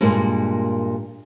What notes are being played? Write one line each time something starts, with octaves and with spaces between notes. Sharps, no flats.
G2 A#2 G#3 A#3